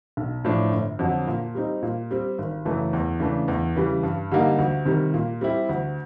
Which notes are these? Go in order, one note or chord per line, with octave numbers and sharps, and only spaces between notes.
B1
A2 F3 A3 D4
G1
F2 D3 F#3
A#2
G3 C4 D#4
A#2
G3 C4
G#1
F#2 C#3 E3 A3
E2
C#3 E3 A3 D4
E2
C#3 E3 G3
G2
D3 G3 A#3 D#4
D2
C3 D#3 G3
A#2
G3 C4 E4 G4
D2